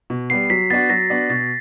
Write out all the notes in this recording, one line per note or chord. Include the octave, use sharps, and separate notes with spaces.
B2
G3 B3 C7
F#3 B6
B3 D4 F#4 A6
F#3 A#6
B3 D4 F#4
B2 A6